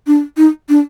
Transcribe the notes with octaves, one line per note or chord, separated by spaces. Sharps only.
D4
D#4
D4